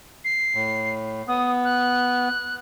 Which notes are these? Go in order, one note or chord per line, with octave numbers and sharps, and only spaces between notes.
C7
A2
B3 D#6
F#6